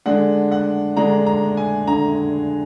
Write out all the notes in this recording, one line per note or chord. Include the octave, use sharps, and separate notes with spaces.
D3 G#3 D4 F#5
F#5
D3 G#3 D4 A#5
A#5
G#5
D3 A#5